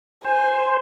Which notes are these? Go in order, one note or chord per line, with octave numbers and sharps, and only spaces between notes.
C5 G#5